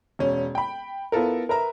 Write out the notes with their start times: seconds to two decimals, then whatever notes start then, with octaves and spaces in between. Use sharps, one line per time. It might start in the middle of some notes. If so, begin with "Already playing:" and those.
0.19 E1 C#4
0.55 G5 B5
1.12 B3 E4 F4 A4 A#4
1.49 A#4 B4 E5 A#5